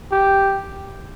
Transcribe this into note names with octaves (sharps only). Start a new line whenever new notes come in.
G4